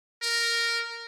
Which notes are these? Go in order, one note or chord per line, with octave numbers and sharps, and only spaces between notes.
A#4